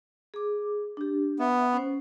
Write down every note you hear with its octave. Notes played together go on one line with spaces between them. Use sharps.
G#4 D6
D4 G4
B3 E5
C#4 C5